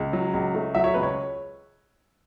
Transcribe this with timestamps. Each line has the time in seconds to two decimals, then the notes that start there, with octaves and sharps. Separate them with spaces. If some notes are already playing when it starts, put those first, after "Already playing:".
Already playing: C#2
0.13 F#3
0.34 C#2
0.55 A3
0.75 F#3 E5
0.84 C#5
0.94 C#2 B4
1.03 C#5